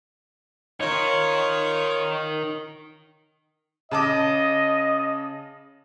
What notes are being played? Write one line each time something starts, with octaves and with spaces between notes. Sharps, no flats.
D#4 F4 A#4 C#5
C#3 D#5 A5 D6